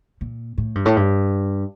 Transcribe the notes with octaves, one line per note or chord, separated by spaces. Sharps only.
A#2
A2
G2
A2
G2